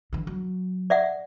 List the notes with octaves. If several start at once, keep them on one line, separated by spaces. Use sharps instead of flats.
D3 E3
F#3
D5 E5 F#5